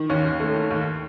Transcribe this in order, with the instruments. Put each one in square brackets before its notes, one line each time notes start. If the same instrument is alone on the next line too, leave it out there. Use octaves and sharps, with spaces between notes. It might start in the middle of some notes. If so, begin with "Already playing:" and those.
Already playing: [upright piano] D#3
D#2 C#4
D#2
A3
D#3
D#2